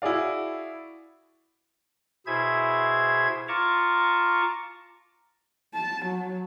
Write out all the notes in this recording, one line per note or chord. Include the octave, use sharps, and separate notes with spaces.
E4 F#4 G#4 D5 F5
B2 E4 G#4 C5 E5 G#6
F4 A5 A#5 C#6 D6
A5
F#3